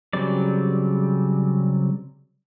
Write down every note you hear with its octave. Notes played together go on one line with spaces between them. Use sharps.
C#3 F#3 G3 C4 D5